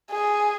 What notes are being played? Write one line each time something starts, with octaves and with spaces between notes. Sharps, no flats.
G#4